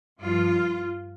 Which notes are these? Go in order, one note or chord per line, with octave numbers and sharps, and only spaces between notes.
G2 F3 F4